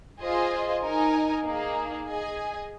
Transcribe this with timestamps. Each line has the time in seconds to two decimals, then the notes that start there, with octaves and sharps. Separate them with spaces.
0.20 F4 G#4 C5 D#5 G#5
0.82 D#4 A#4 D#5 G#5
1.44 A#3 D#4 G#4
2.06 G#4 D#5 G#5